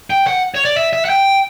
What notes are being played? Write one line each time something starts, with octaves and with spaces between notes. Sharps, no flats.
G5
F#5
C#5
D5
E5
E5
F#5
G5